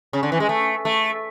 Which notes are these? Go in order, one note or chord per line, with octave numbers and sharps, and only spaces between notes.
C#3
D3
E3
G#3
A3
A3